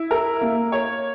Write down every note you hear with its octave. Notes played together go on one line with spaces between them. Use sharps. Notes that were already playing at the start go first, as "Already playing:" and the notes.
Already playing: E4
A#4
A#3
C#5